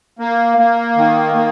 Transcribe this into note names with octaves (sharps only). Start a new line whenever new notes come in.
A#3
A#3
D#3
A#3